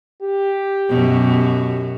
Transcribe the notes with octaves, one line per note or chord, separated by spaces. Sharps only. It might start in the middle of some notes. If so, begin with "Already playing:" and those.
G4
F#2 B2